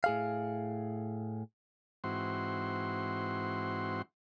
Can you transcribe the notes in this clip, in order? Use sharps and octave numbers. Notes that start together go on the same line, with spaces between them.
A2 G#4 F5
G#2 E3 C4 F#4 C6